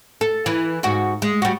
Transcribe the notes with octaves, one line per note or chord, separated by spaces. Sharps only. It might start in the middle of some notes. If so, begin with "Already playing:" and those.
A4
E3
G#2 F#4
G#3
G3 F#4